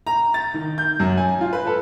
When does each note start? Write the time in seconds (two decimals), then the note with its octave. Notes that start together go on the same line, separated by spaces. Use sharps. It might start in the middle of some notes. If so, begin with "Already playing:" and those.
0.07 A#5
0.34 A6
0.54 D#3
0.78 G6
1.00 F#2
1.17 G#5
1.41 F4
1.53 B4
1.67 A4